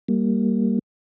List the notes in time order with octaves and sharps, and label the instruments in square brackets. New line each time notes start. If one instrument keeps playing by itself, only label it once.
[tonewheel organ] G3 A#3